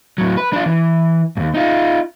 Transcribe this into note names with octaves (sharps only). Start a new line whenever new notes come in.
A2 F#3
B4
D4 F4
E3
D#2 G#2
D#4 F4